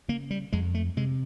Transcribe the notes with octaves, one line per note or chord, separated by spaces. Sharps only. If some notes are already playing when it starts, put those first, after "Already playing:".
C#3 A#3
G3
F2 G#3
A3
C3 G#3